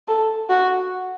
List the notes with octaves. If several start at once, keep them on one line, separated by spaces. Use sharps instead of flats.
A4
F#4